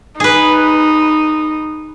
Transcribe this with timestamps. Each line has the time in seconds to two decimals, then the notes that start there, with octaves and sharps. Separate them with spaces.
0.20 D#4 G#4 B4